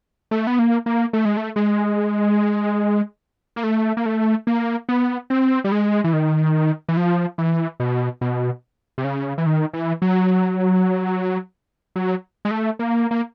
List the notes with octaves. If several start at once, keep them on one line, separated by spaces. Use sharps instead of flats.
A3
B3
A#3
A#3
A3
G#3
A3
G#3
A#3
A3
A#3
A3
A#3
B3
C4
G3
G#3
E3
D#3
E3
F3
E3
B2
B2
C3
C#3
E3
D#3
E3
F#3
F#3
G#3
A3
A#3
A#3